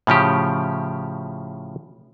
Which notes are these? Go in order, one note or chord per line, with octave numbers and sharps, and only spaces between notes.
A2 C#3 F3 G4